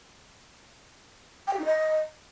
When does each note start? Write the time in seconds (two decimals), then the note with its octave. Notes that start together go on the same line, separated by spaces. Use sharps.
1.47 G5
1.53 G4
1.59 D#4
1.65 D#5